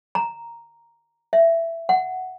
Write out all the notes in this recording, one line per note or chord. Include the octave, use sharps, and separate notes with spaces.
A#5
E5
F#5